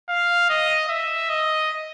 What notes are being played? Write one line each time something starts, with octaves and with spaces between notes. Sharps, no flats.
F5
D#5
E5
D#5